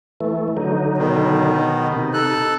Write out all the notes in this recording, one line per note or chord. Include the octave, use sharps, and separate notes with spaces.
E3 A3
D3 F#3 D#4
B2 D#3
C3 D#4
A4 F#6